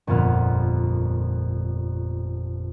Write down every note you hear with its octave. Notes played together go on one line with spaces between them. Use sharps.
G1 F2 A#2 B3 F6